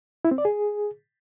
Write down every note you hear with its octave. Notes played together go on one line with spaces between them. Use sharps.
E4
C4
D5
G#4